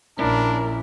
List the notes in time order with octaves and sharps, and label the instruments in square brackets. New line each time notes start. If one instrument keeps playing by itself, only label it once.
[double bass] A#1 [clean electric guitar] C#4 E4 [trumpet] D4 [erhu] A#4